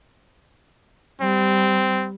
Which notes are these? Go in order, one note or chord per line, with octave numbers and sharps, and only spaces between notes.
G3 C4